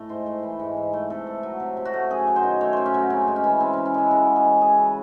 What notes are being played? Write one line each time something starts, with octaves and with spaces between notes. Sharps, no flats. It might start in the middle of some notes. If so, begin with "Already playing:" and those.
Already playing: A2 A3
G#2 C5
A3
E3
G#2
G#2
A3
C3 A4
A3
F#3
C3
C3
F#4
A3
F#2 G#4
F#3
C5
D#3
A3 C#5
F#2 C5
C#4
F#3
C#3 C4
G#3
C#4
E3
C#3 C4
C#3 C#4
C#4
G#3 E4
C#3 F#4
G#3
G#4
E3
C#3 G#4
C#3